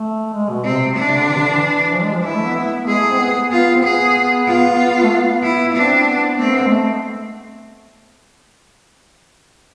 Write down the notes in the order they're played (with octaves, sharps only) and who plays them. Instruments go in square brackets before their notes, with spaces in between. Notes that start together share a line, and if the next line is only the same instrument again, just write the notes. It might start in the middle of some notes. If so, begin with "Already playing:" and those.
Already playing: [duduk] A3
G#3
B2
[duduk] C3 [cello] C4
[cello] D4
[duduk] C3
D3
E3
C3
D3
E3
F3
G#3
F3
[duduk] E3 [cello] E4
[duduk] G#3
A3
B3
B3
[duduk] G#3 [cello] G#4
[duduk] A3
C4
B3
[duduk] B3 [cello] F4
[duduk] C4
[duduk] B3 [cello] G#4
[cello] F4
[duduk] A3
B3
[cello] E4
[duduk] C4 [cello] D4
[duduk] B3
[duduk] A3 [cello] C4
[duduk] B3
G#3
A3